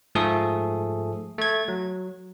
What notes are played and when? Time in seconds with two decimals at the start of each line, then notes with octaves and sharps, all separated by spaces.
0.15 G#2 F3 A3 G#4 A4 D#6
1.38 A3 G#6
1.68 F#3